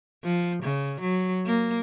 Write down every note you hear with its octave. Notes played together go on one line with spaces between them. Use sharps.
F3
C#3
F#3
A#3